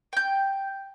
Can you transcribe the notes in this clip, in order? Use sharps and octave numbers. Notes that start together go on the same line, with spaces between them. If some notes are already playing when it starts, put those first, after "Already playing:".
G5 G6